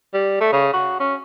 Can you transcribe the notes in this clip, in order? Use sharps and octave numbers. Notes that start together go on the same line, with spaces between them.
G3
A3
C#3
F#4
C#4